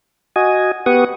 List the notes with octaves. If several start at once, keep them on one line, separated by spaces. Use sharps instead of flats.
F#4 D#5 G#5
B3 G4 B4 F#5 C#6 D#6